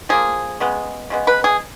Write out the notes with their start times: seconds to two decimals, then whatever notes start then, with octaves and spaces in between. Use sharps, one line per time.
0.09 F3 A#3 G#4
0.60 C#3 G#3 B3
1.10 C#3 G#3 B3
1.27 B4
1.44 G#4